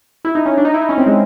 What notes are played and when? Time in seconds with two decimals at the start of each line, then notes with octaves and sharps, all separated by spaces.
0.25 E4
0.35 D#4
0.46 C#4
0.58 D4
0.65 D#4
0.74 E4
0.82 D#4
0.89 C#4
0.98 C4
1.06 G#3